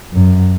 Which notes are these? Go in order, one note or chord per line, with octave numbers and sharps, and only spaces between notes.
F#2